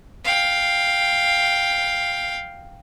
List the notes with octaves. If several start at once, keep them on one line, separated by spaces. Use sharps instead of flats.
F5 G5